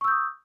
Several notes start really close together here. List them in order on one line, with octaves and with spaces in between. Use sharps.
C#6 E6 G6 D#6